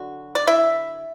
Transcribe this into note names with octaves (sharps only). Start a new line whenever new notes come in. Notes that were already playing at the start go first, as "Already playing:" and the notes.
Already playing: D3 F#3 F#4
D5
E4 E5